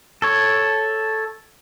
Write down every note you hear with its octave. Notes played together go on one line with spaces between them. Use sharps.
A4 C#5